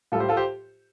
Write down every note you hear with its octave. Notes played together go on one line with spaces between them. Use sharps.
A2 G3 F4 A4
G4 C5
F4 A4
G4 C5